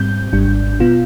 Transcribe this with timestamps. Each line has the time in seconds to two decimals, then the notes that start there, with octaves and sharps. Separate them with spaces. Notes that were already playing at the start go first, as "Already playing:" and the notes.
Already playing: G#2 G3 C4 G6
0.32 G#1 G#2 G3 D4
0.80 B2 B3 F4